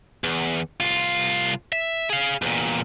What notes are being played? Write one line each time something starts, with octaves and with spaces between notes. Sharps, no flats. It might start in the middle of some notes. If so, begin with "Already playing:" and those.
E2
C2 F4
E5
G#4 F5
E2 A#2